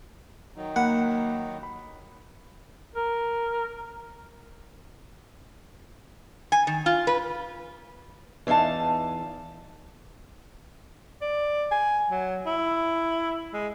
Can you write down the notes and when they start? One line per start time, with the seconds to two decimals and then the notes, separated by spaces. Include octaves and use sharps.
0.56 D#3 F#3 D#4
0.76 A#3 F#5 B5 F#6
1.63 B5
2.96 A#4
6.52 G#5
6.67 D#3
6.86 F4
7.07 B4
8.47 E2 E3 D#4 F5 A5
11.22 D5
11.71 G#5
12.10 F#3
12.46 E4
13.53 G#3